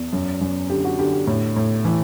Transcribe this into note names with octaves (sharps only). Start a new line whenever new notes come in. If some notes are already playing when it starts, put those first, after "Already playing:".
Already playing: E2
F#2
F#2
D3 G4
F#4
D3 G4
G4
A2
A2
E3